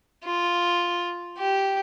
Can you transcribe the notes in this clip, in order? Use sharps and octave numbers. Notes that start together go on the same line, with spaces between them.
F4
G4